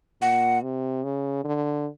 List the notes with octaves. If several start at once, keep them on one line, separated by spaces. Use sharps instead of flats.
A#2 F#5
C3
C#3
D3